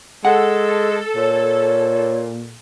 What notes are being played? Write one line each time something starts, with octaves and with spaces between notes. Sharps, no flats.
G#3 A4 F#5
A#2 C#5